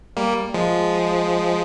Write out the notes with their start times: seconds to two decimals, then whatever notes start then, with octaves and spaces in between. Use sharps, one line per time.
0.17 G3 A#3
0.54 F3 G#3